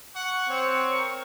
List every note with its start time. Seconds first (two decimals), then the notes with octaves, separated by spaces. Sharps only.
0.16 F#5 C#6
0.49 C4 C#5
0.93 A#4